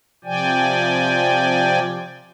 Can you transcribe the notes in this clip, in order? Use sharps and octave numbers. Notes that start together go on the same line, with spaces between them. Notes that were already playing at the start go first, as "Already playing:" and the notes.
C3 F3 D5 G5 G#5